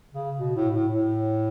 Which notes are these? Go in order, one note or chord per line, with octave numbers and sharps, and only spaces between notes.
C#3
B2
A2
A2
A2